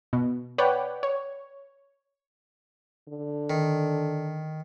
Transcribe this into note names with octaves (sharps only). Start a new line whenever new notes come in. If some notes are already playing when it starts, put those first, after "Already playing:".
B2
B4 C#5 D5 F#5 G5
C#5
D3
D#3